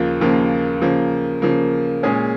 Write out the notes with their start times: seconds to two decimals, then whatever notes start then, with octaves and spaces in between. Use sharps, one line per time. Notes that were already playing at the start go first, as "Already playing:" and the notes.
Already playing: D#2 C#3 F3 A#3 F4
0.21 D#2 C#3 F3 A#3 F4
0.82 C#3 F3 A#3
1.42 C#3 F3 A#3
2.03 A#2 G#3 C#4 G#4